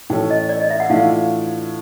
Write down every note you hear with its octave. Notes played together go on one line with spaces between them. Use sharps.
A2 E3 A3 C#4 G5
D#5
D5
D#5
E5
F#5
A2 E3 A3 D4 F4 F5